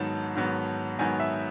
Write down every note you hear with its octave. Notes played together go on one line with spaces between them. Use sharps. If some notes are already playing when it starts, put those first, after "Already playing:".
Already playing: G#2 D#3 F#3 B3 A5
G#2 D#3 F#3 B3
G#2 D#3 F#3 B3 G#5
E5